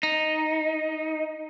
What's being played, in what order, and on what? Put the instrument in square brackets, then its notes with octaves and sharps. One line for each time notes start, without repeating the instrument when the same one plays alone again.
[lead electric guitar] D#4